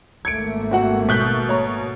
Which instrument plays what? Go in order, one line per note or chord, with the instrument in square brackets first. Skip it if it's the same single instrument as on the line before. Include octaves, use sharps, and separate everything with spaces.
[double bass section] G#1 A3 A#3 [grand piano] G#6 C#7 D7
[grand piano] C4 F#4 F#5
[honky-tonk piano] B2 F#6 G6 [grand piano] B6
[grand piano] C#5 A#5